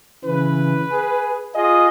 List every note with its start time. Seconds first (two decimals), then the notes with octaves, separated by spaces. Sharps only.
0.25 C#3 E3 B4
0.91 G#4
1.55 F4 G#4 D#5